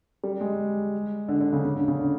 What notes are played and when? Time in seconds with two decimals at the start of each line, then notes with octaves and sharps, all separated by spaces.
0.24 G3
0.41 G#3
1.28 D3
1.41 D3
1.53 C#3
1.65 C#3
1.76 D3
1.88 C#3
1.99 D3